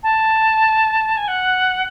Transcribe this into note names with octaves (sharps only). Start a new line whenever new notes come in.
A5
G#5
F#5